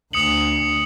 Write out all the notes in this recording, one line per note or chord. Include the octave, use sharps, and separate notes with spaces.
D2 D#6 C#7 F#7